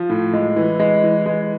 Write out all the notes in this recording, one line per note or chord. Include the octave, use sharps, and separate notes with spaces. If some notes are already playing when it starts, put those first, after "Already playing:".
Already playing: F3
A2
G#3
E3
G#3
E3
G#3